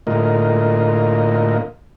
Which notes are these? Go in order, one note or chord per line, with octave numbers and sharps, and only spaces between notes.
A2 D3 A#3 F4 A#4 D#5